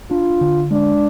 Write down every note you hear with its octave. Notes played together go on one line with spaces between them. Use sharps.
D4 F4
D3
G#3 D4